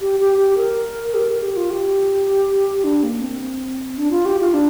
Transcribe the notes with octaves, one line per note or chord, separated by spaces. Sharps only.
G4
G4
G4
A#4
G4
A#4
G4
F4
G4
D4
A#3
C4
D4
F4
G4
F4
D4